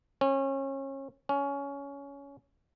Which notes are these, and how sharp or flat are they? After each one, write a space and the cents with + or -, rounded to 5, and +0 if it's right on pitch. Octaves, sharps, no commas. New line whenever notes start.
C#4 -30
C#4 +15